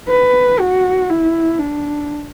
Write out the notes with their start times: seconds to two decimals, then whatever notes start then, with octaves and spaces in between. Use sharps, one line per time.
0.08 B4
0.59 F#4
1.10 E4
1.59 D4